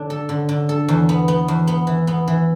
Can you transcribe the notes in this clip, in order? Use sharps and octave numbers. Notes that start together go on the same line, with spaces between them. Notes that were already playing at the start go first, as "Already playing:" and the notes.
Already playing: D3 D4
A4
D3
D3
A4
E2
B3
B3
E2
B3
E3
B3
E3